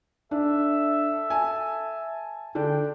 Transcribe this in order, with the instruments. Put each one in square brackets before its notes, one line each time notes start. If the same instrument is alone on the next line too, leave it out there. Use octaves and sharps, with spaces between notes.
[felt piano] D4 [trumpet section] A4 E5
[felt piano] G#5 A5
[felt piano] D3 D4 [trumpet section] G5